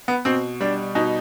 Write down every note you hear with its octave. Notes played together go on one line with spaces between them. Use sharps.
B3
B2 C4
G3 D4
B2 D#4